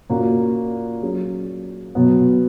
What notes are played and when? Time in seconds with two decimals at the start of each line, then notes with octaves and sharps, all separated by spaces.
0.10 A#2 A#3 C#4 F#4 A#4
1.02 F#3 C#4 G#4
1.95 B2 F#3 B3